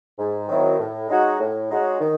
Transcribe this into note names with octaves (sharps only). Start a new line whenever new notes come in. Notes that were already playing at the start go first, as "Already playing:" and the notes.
G#2
D#3 F#3 C4 E4
A2
G#3 D#4 F#4 C#5
A2
G#3 D#4 F#4 C#5
D#3